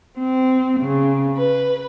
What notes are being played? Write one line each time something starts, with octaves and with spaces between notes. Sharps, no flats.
C4
C#3
B4